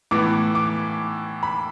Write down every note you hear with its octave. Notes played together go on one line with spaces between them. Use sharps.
A2 E3 B3 D6
D6
B5